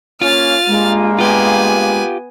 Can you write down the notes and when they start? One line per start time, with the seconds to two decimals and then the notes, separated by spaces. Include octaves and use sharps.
0.21 A#3 C#4 F4 F6 A6
0.68 G2 G#3 A#3
1.19 B3 F4 G4 G#5